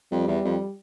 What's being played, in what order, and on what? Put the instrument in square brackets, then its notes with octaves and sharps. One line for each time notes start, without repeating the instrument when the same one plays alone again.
[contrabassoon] F2 [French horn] G3
[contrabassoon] E2
F2